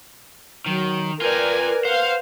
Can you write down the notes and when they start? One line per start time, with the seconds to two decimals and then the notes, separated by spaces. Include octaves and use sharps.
0.66 D#3 F#3
1.22 F4 A#4 B4 D5 G5 G#5
1.85 C5 F5 F#5